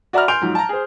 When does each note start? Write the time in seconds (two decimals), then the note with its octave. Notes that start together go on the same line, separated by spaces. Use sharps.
0.13 F#4 D5 E5 A#5 B5 F6
0.28 G#5 C6 G6 D7 F7
0.41 G#2 F3 F#3
0.55 A5 A#5
0.69 G#4 C5